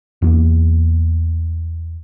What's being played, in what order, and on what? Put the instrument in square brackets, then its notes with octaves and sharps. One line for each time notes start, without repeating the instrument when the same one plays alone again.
[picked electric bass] E2 A#3